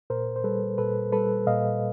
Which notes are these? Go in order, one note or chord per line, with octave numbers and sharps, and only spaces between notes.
A#2 A#4 C5
C5
G3 A4 B4
A#2 A4 B4
G3 A4 B4
A#2 D#5 F5